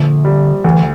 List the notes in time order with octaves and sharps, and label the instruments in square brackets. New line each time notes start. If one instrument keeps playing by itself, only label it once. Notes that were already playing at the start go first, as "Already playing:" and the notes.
Already playing: [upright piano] A#1 [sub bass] D3
[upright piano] G3
[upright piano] D2 [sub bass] E3